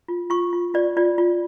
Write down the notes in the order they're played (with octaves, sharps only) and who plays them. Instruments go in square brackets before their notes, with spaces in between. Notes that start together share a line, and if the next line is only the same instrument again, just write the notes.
[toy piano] F4
F4 C#6
F4
F4 D5
F4 D5
F4